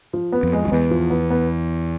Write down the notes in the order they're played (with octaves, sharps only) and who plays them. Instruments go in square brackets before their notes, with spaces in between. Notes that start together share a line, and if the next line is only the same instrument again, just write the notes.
[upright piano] F3
B3
[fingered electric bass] F2
[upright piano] G#3
[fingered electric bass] F2
[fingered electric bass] E2 [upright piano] B3
[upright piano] F3
B3
B3